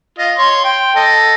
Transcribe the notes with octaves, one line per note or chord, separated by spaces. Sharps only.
F4 D#5
C#5 C6
G5
A4 D#5